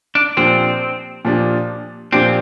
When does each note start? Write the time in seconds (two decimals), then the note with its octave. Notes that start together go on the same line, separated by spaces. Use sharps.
0.15 D4
0.37 A#2 F3 C4 D4 G4
1.25 A#2 F3 D4 G4
2.12 A#2 F3 C4 D4 G4